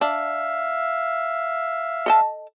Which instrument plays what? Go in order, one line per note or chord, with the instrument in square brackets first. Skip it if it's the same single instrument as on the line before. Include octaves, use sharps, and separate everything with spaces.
[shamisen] D4 [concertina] E5 F5
[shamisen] A4 D#5 A5